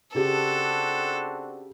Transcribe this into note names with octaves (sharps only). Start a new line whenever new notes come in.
C#3 C4 D4 F#4 G4 A4